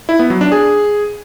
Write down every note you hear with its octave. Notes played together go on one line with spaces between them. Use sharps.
E4
B3
F#3
D4
G#4